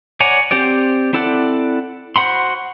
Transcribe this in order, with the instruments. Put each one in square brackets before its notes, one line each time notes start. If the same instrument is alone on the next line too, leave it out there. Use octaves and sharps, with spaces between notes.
[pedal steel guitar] C#5 D5 F#5 G#5 A#5
C4 G4 C5 D5
C4 E4 A4 D5 F#5
F#4 C5 F#5 B5 C6